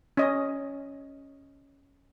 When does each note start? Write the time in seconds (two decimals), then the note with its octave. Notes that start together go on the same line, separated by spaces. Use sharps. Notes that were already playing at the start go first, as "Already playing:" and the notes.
0.17 C#4 D#5